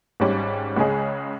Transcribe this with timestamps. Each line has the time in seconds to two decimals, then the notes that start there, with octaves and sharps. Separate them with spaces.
0.20 G#1 G#2 G3 C#4
0.77 C#2 C#3 G#3 C#4 G#4